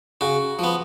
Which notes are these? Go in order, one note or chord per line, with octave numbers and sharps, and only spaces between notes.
C#3 F#4
F3 B3